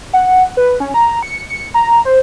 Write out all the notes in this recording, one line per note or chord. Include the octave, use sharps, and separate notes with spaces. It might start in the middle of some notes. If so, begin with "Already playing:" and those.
F#5
B4
C#4
A#5
C#7
C#7
A#5
C5